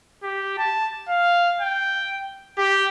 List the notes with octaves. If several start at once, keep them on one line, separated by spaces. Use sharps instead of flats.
G4
A5
F5
G5
G4